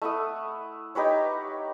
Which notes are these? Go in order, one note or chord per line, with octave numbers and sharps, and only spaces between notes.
A3 E4 F#5 D#6
D#4 G4 B4 C#5